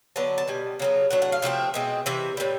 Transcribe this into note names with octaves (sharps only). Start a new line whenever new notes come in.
D3 F#3 B3 D4 A5
A5
B2 G3 G#5
C#3 F#3 B3
A2 F#3 A3 D4 F#5
F#5
F5
C3 F3 A3 C4 E5
B2 G#3 C4
C3 E3 E5
A2 E3 G3